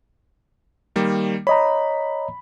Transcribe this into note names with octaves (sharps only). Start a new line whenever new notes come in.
D#3 G3 A#3
C#5 D#5 A#5 B5